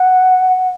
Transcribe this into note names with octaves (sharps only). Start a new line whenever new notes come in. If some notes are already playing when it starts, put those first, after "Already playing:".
Already playing: F#5